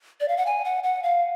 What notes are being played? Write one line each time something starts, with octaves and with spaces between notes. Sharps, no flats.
D5
F5
F#5
G#5
F#5
F#5
F5